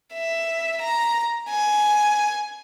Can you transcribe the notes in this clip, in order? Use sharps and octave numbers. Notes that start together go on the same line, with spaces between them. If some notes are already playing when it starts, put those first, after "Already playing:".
E5
A#5
G#5